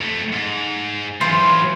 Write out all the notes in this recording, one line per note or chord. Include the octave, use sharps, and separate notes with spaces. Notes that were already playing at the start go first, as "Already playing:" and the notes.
F2 A3
G#2
G#2 E3 F#3 F4 C5